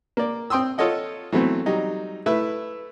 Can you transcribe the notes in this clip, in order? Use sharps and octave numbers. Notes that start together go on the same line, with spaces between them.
A#3 D5
C4 G5 C6 D#6 E6
F4 A4 C#5 D#5 F#5
E3 F#3 A3 B3 C4
F#3 G3 D#4
A3 E4 B4 E5